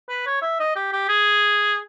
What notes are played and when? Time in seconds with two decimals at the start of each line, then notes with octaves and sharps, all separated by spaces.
0.09 B4
0.26 C#5
0.42 E5
0.60 D#5
0.76 G4
0.92 G4
1.09 G#4